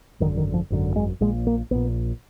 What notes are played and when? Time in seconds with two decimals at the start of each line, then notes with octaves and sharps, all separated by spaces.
0.20 G#1 F#2 D3 D#3
0.37 D#3
0.54 F3
0.70 G#1 F#2 D3
0.96 G#3
1.20 A#1 A#2 G#3
1.47 A#3
1.71 A#1 A#2 B3